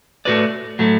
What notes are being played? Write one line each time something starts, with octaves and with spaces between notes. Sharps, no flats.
A2 A3 F#4 B4 D5
A2 F#3 A3